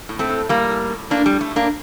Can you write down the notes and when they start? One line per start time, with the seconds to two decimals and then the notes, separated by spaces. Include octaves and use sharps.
0.09 A2
0.19 A3 C4
0.29 A2
0.49 A2 G3 A#3
0.70 A2
0.90 A2
1.10 A2 A#3 D4
1.26 G3
1.31 A2
1.41 A3
1.51 A2
1.56 A#3 D4